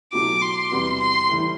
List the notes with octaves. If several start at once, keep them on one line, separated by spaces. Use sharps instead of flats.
B2 F#3 A3 E4 G4 D6
C6
E2 C3 G3 B3 F#4
C6
A2 E3 G3